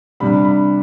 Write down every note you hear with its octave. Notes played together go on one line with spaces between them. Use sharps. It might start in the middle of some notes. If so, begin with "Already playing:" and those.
C3 G3 D4 B5
B5